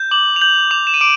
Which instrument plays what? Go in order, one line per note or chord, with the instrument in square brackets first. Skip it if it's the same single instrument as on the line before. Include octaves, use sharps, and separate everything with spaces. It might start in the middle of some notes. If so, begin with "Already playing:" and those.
Already playing: [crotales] G6
D6 F#7
F7
G6 F#7
D6 F7
E7
D#7
D6 D7